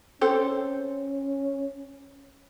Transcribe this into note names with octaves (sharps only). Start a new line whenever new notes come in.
C4 C#4 A4 C5